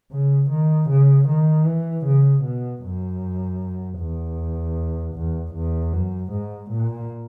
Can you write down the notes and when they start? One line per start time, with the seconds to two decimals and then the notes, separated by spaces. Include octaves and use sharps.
0.12 C#3
0.50 D#3
0.90 C#3
1.28 D#3
1.66 E3
2.06 C#3
2.44 B2
2.83 F#2
3.99 E2
5.15 E2
5.54 E2
5.93 F#2
6.32 G#2
6.71 A#2